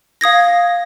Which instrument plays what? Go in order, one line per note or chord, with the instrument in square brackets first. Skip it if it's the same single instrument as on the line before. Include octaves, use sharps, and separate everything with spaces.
[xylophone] F5 D#6 G#6 A#6